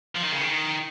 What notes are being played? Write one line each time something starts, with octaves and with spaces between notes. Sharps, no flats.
F3
D#3
C#3
D#3